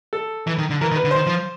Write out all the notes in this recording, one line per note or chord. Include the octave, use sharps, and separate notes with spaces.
A4
E3
D#3
D3
E3 A#4
D#3
B4
D3
D#3 C5
F3